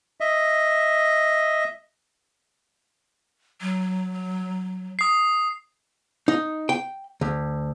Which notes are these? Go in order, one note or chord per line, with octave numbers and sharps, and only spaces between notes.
D#5 E5
F#3
D#6 C7
D#4
G5
D2